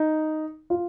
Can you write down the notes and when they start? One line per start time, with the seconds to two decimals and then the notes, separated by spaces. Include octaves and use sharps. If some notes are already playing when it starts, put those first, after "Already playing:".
Already playing: D#4
0.70 F4